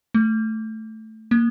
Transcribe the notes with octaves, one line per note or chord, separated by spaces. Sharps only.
A3
A#3